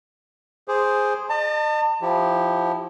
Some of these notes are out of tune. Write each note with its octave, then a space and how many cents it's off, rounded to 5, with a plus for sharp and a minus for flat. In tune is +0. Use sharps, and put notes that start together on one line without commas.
G#4 +0 C5 +0 D6 -10
D#5 -40 A5 +35
F3 +0 E4 -15 G4 +0